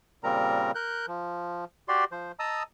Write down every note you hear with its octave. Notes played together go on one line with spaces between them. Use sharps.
A#2 C#3 G3 C4 A#4 A#5
A#4 F#6 G6
F3
F#4 G4 D5 C6
F3 C5
D#5 A5 A#5 D#6 E6